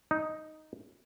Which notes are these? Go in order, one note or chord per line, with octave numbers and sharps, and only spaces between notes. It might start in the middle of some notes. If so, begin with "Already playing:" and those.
D#4